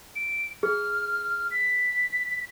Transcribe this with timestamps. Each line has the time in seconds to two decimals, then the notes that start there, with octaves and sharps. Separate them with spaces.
0.16 D7
0.63 G#4 F6
1.51 B6